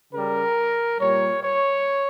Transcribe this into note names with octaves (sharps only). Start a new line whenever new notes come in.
C#3 G3 A#4
A#2 G3 C#5
C#5